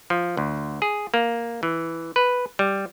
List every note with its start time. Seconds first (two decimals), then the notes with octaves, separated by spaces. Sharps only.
0.10 F3
0.37 D2
0.82 G#4
1.14 A#3
1.63 E3
2.16 B4
2.59 G3